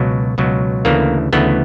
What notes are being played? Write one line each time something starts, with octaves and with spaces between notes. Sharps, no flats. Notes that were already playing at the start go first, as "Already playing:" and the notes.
Already playing: C#2 B2 F#3
C#2 B2 F#3
D2 C#3 E3 A3 A#3
D2 C#3 E3 A3 B3